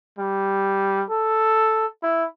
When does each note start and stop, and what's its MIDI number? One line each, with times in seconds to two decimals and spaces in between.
0.19 1.02 55
1.10 1.86 69
2.03 2.24 64